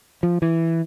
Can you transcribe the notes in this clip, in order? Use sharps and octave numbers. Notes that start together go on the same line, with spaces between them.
F3
E3